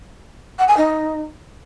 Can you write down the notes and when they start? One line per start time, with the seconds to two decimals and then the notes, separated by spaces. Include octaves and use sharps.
0.58 F#5
0.67 G#5
0.76 D#4